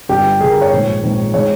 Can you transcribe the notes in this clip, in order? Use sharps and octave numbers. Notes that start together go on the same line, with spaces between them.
G1 G2 G3 G4
G1 G2 G3 G#4
A#4
C#5
A#1 G#2 D#3 G#3
A#1 G#2 D#3 G#3
D#3 G#3 C#5